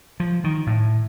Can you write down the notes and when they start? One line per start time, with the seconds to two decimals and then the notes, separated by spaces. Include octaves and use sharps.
0.20 F3
0.44 D#3
0.67 A2